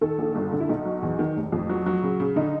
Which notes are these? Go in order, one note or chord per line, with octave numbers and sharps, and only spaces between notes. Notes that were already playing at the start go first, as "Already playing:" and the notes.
D#3 A4
A#1
G1
D3
E4
B1 D#4
F#3
E2
D#3
F1
F2
F#3
F#3
C#3
C#3
D3 D#4